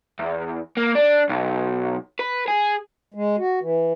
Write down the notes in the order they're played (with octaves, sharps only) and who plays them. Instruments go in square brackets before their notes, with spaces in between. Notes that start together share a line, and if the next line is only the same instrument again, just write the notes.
[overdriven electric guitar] E2
A#3
D4
B1
B4
G#4
[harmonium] G#3
F#4
E3